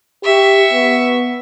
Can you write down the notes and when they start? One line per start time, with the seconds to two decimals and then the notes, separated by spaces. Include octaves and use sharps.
0.24 G4 E5 C#6
0.72 B3